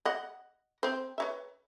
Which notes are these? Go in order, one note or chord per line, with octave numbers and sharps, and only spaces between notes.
D#5 F#5
C4 C5
B4 C#5 E5